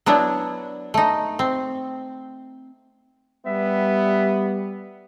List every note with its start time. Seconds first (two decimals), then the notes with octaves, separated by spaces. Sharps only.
0.06 F#3 B3 D4 E4
0.94 A3 D#4
1.39 C4
3.46 G3 B3 E5